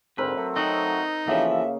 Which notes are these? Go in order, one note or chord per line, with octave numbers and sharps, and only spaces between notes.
D2 G#2 C4 A#4 B4
F#3 A3
C4 D#4 F#4 D#5
C#3 E3 F3 A#3 F#4 A4 E5